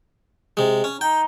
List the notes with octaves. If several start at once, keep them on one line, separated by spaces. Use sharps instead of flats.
C3 G#3
C#4
D#4 G5